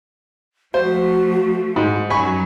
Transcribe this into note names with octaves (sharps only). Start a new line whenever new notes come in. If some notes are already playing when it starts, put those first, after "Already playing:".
F3 A3 F#4 C5
G#2
F#2 F#3 G#5 B5 C#6